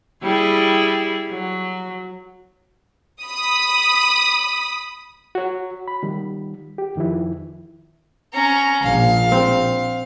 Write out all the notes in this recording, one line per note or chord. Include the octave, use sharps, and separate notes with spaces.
G3 E4 G#4
F#3
B5 D#6
F#4 C#5
B5
D#3 G3
G4
F2 D#3 F3 E4
C#4 A#5
A#1 A#2 F5
C4